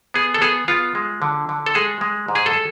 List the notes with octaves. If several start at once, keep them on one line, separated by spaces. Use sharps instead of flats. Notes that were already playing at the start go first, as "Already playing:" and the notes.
B3 G#4
A4
B3 G#4
B3 F4
G#3
D3
D3
A4
G#3 G#4
G#3
G#2
G#4
A4